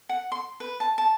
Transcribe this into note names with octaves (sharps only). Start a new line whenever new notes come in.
F#5
C6
B4
A5
A5